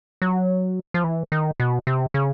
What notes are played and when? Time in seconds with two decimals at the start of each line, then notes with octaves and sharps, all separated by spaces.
0.22 F#3
0.94 F3
1.04 E3
1.32 D#3
1.60 B2
1.87 C3
2.14 C#3